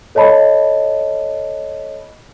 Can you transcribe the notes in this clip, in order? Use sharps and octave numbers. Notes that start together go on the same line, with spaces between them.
A4 C#5 D#5 A5 B5